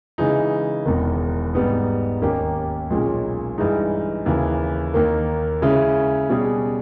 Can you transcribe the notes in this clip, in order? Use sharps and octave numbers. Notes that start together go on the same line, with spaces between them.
C#3 E3 G#3 D#4
E1 E2 D#3
G#2 G3 B3 D#4
D#2 D#3 A#3 C#4 G4
B1 A#2 G#3 C#4
G2 E3 G#3 D#4
D#2 C#3 E3
D#2 D#3 A#3
C#3 G#3 C#4 E4
B2 G3 C#4 G#4